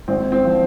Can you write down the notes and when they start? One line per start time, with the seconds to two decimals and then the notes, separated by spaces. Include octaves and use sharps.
0.08 G#1 C4
0.32 C4
0.44 F3